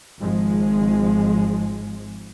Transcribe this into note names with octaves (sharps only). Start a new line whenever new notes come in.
G#1 F3 G#3